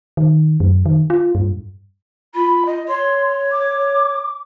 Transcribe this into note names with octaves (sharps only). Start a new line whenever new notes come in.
D#3
F#2
D#3
F4
G2
F4 B5
D#5
C#5 C6
D6